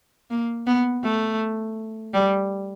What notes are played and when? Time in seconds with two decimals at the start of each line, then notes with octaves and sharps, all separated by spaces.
0.30 A#3
0.67 B3
1.03 A3
2.14 G3